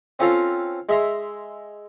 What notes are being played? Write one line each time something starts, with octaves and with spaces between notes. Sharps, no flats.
C4 C#4 F4 A4 F5 A#5
G#3 E5 A#5 C6